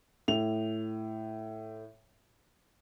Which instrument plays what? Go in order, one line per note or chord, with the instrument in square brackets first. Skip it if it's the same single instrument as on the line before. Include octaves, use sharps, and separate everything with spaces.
[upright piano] A2 F7